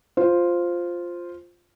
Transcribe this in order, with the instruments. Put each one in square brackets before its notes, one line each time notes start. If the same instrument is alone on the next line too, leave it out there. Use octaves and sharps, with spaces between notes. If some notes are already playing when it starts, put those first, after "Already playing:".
[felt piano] F4 C5